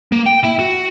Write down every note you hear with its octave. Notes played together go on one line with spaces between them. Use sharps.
A#3
G5
E4 E5
F#4